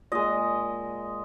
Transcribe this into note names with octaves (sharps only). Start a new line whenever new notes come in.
A#2 G#3 D#5